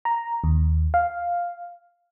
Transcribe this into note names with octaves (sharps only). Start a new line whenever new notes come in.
A#5
D#2
F5